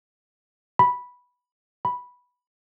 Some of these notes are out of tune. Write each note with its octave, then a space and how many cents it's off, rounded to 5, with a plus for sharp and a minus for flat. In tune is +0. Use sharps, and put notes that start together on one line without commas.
B5 -5
B5 -5